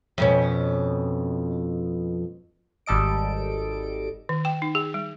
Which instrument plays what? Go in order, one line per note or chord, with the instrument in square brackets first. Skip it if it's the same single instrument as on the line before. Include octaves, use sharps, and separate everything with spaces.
[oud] F2 B2 C#4
[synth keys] G#1 G3 A4 D#5 D7
[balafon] D#3
G5
D#4
G#4
G3